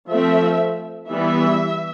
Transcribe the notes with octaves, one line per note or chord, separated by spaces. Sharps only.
F3 A3 C4 E5
E3 G3 B3 E5